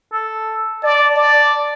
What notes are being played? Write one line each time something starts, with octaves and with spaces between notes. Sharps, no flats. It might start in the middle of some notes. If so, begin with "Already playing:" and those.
A4
D5 A5
D5